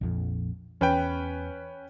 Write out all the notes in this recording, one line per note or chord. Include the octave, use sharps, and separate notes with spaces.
A#1 F2
E2 C#4 B4 G5